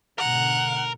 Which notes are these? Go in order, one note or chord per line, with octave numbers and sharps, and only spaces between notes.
G#2 B2 D3 A#4 F#5 A#5